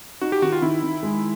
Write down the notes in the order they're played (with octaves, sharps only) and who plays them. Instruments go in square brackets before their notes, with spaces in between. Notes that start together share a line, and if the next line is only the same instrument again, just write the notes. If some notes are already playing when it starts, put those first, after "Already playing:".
[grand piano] D#4 [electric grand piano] F#4
[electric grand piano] G4
[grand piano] D#3 [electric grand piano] F#4
[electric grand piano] F4
[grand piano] D#3 [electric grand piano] E4
[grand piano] D#3
G#3